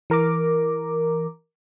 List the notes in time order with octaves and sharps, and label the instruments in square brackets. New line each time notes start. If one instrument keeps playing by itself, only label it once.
[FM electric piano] E3 A#4 A#5 D6